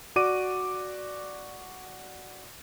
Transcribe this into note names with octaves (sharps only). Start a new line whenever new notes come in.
F#4 D5 D6 D#7